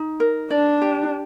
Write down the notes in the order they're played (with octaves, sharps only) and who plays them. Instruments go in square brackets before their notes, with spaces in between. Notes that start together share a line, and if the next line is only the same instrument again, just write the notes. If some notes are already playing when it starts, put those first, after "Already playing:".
Already playing: [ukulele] D#4
A#4
[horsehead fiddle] D4 [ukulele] D5
[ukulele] G4